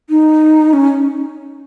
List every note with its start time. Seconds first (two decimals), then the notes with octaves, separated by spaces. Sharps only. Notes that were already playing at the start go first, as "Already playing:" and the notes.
0.10 D#4
0.73 C#4